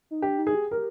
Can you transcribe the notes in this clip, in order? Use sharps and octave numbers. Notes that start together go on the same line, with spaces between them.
D#4
D4 G4
D#4
G#4
G4
G4 A#4